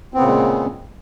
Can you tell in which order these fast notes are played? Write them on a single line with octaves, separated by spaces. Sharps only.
C4 B3 C#3 A#2 G#3